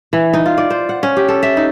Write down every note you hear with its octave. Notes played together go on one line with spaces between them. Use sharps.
E3
D#4
F4
D5
C5
F#5
C#4
G4
A4
E5
D#4